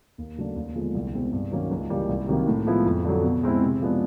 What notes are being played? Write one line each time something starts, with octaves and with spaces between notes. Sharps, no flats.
D#2
C#3 F#3 A3 D4
D#2
D3 F3 G#3 B3
C2
B2 G#3 C4
G2
D#3 F#3 A#3 C#4
C#2
C#3 E3 G3 A#3
C2
C3 D#3 F#3 A#3
A2
F3 G#3 B3 E4
F2
D3 F#3
B2
G#3 C4 E4
C3
F3 G#3 B3 D4